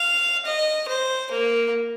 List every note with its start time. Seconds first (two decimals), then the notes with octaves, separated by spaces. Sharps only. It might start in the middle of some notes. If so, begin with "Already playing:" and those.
Already playing: F5
0.45 D#5
0.88 C5
1.31 A#3